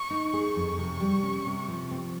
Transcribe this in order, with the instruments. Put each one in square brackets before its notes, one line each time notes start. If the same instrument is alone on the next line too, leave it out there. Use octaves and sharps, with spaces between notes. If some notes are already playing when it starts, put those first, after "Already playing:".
Already playing: [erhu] C#6
[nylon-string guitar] D#4
G#4
[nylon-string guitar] F2 [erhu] C#6
[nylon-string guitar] C3
G3
C#4
C3
F3
C4